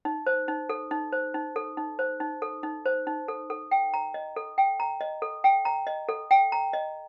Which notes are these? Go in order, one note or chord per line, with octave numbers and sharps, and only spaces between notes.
D#4
C5
D#4
A4
D#4
C5
D#4
A4
D#4
C5
D#4
A4
D#4
C5
D#4
A4
A4
G5
A#5
D#5
A4
G5
A#5
D#5
A4
G5
A#5
D#5
A4
G5
A#5
D#5